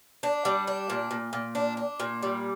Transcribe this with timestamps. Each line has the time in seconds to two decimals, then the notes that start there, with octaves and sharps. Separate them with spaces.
0.23 D4
0.45 G3
0.67 D4
0.90 A#2
1.11 A#2
1.33 A#2
1.55 D4
1.77 D4
2.00 A#2
2.23 G3